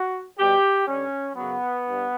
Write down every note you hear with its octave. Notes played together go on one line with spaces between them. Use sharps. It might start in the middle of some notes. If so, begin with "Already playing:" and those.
Already playing: F#4
B2 G3 G4
G2 D3 G3 C#4
F#2 C#3 F#3 B3
G2